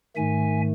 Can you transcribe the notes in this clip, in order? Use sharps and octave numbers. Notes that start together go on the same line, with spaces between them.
G#2 D#3 A3 E5 G#5